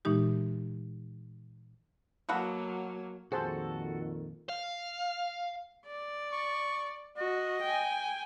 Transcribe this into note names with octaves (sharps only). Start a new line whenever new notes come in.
A#2 E3 G#3 D#4 G4
B2 F#3 A#3 F#4 A4 F5 F#5 B5
F2 A#2 D#3 F#4 G#4 A4 C5 A5
F5
D5
C#6
F#4 D#5
G5 G#5